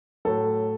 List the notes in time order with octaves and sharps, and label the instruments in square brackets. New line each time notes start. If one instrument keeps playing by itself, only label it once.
[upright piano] A2 F#3 A4